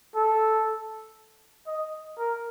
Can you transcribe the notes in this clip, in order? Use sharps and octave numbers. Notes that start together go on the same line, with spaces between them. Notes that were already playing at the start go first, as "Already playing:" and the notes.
A4
D#5
A#4